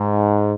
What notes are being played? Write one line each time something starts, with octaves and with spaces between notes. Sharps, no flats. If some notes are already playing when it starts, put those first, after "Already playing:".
Already playing: G#2